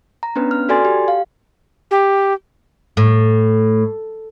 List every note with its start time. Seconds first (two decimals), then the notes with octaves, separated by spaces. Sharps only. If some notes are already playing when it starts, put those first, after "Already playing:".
0.23 A#5
0.36 B3 C#4 D4 B4
0.51 F6
0.69 F#4 A4 D5 G#5 C6 A6
0.85 G4
1.08 F5
1.91 G4
2.97 A2